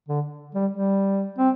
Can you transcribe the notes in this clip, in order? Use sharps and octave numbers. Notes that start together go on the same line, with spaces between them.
D3
G3
G3
C4